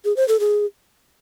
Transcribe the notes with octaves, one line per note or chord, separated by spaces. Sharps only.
G#4
C5
A4
G#4